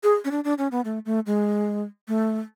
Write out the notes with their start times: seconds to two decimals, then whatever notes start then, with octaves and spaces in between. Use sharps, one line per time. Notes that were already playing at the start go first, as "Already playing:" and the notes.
0.04 G#4
0.25 C#4
0.31 D4
0.44 D4
0.58 C#4
0.72 B3
0.85 A3
1.06 A3
1.26 G#3
2.08 A3